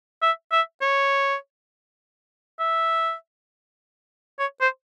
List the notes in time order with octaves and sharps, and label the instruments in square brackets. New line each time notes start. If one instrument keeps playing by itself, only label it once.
[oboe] E5
E5
C#5
E5
C#5
C5